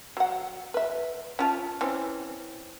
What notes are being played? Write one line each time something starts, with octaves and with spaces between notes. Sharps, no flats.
F#3 F#5
B4 E5
C#4 F4 A5
E3 C4 C#4